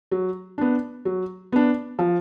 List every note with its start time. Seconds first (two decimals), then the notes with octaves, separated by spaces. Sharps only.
0.11 F#3
0.58 B3 D4
1.05 F#3
1.52 B3 D4
1.99 F3